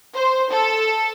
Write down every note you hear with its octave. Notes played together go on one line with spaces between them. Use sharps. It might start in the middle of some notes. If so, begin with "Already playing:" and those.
C5
A4